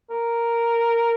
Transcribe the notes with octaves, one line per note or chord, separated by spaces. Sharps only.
A#4